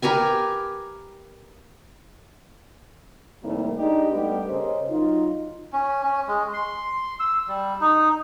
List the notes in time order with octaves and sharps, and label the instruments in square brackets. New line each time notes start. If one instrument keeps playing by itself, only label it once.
[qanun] G4 A#4 B4 G#5
[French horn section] A2 C3 D#3 G3 A#3
G#3 D4 D#4 G4 D#5
G2 G3 A3 B3 G4
C#3 C#4 A#4 C5 D#5
F#3 D#4 F4
[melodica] C#4
C#4
G#3
C6
E6
G3
D#4